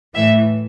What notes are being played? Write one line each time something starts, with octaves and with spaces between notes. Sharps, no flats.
A2 E3 E5